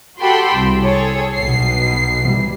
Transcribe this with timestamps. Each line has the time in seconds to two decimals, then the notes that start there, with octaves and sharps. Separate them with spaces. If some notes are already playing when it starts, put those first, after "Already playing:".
0.19 F#4 G4 A4 G5 B5 C6
0.52 C2
0.83 G#4 A4 C#5
1.35 B1 B2 C7
2.25 E3 G3